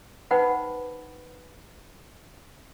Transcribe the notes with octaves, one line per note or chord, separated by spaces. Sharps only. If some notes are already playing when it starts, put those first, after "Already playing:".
D#4 B4 C5 F#5 G5 B5